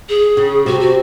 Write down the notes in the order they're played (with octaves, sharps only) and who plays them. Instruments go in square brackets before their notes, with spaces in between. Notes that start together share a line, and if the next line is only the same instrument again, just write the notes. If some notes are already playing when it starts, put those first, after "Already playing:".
[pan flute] G#4
[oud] C#3
[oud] C3 [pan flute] F#4
[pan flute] F#4